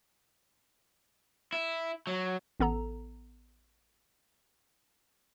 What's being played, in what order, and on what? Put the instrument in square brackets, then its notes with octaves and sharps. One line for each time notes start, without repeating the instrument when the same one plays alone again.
[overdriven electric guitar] E4
F#3
[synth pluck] A1 B3 A4 A#5